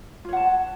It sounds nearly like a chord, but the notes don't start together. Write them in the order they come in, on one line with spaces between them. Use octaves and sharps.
F4 C#5 F#5 A5